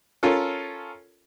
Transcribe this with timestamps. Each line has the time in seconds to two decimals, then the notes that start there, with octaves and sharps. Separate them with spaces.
0.23 C#4 F4 A4 A#4